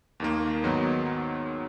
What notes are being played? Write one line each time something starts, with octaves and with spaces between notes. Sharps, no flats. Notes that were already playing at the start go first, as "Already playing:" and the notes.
D#2 D#3 A#3
G#2 D#3 F#3 B3 D#4